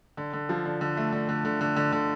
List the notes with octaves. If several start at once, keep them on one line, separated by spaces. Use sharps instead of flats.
D3
D3
F3
D3
D3
A3
D3
D3
D3
D3
D3
D3